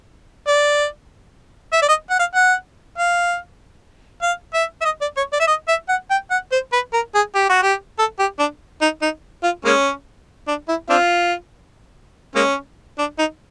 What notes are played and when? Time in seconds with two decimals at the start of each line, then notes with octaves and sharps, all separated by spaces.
0.48 D5
1.73 E5
1.82 D5
1.89 D#5
2.10 F#5
2.19 F5
2.35 F#5
2.98 F5
4.22 F5
4.54 E5
4.81 E5
4.85 D#5
5.01 D5
5.17 C#5
5.33 D5
5.40 E5
5.47 D#5
5.68 E5
5.89 F#5
6.11 G5
6.31 F#5
6.52 C5
6.73 B4
6.94 A#4
7.15 G#4
7.35 G4
7.50 F#4
7.63 G4
7.99 A4
8.19 G4
8.39 D4
8.81 D#4
9.02 D#4
9.43 F4
9.65 G#3 A#3 C#4
10.48 D4
10.68 E4
10.90 C4 D4 F4
12.35 G#3 A#3 C#4
12.98 D4
13.18 D#4